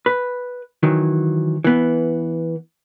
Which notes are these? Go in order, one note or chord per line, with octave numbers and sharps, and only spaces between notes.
B4
D#3 E3 F#3
E3 B3